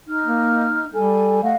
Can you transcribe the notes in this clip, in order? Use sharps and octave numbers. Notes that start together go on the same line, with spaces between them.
D#4 F6
A#3
G3 A4 G#5
A3 D#5 F5 F#5